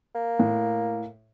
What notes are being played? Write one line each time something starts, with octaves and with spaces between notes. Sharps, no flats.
A#3
A2